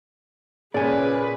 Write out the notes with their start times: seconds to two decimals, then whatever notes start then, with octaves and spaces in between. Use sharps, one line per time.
0.74 A#2 C#3 G#4 B4 D5 G#5